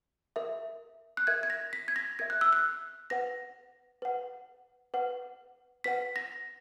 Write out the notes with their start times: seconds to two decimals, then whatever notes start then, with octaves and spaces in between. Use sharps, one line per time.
0.36 A#4 E5
1.17 F#6
1.27 A#4 E5 G#6
1.43 G#6
1.50 A#6
1.73 B6
1.88 G#6
1.96 A#6
2.19 A#4 E5 G#6
2.30 F#6
2.41 E6
2.53 F#6
3.10 B4 F#5 A#6
4.02 B4 F#5
4.94 B4 F#5
5.84 B4 F#5 B6
6.16 A#6